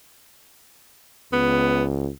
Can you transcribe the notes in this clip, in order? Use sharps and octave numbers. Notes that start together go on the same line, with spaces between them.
C#2 B3